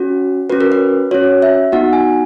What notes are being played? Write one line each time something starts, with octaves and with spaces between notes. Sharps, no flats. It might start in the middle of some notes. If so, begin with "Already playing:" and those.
Already playing: C#4 F#4
C#4 F#4 B4
A#4
B4
C#4 F#4 C#5
E5
B3 D#4 F#4 F#5
G#5